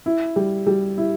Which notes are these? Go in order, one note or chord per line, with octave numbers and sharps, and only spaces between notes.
E4
G3
G3
E4